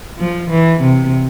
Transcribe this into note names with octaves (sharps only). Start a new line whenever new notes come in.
F3
E3
C3